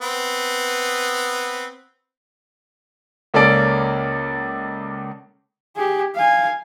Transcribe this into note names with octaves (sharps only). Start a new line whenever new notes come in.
B3 C4 B4
C#2 A#3 C#4 A4 D5 D7
G4 G#4
F5 G#5